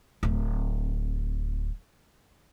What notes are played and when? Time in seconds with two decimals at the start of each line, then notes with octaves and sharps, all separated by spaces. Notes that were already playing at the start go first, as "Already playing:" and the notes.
0.23 D1 C4